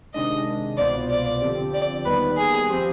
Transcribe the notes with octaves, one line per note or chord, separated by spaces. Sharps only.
C3 D#3 G#3 D4 D#5
C2 B2 B3 F4 C5 D5
D5
D3 F3 C4 G4
D5
D#2 D#3 G3 B3 B4
G#4
F3 C4 G4 C5